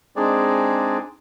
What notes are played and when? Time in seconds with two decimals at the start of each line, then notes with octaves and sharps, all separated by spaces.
0.16 G#3 C4 D4 D#4 G#4 D5